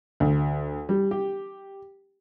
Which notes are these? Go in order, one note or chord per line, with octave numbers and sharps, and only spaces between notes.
D2
G3
G4